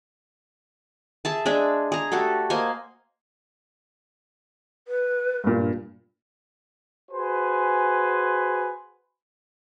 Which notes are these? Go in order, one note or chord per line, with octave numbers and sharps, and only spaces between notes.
G#4 E5 A5
G#3 D4 G#4 E5
G#4 A#5
A3 F#4 G4 A4
A#3 C5 D#5 G#5
B4
G2 A#2
F#4 G#4 B4 C5 G#5